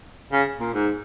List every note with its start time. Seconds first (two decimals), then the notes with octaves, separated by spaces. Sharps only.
0.33 C#3
0.60 A#2
0.74 G#2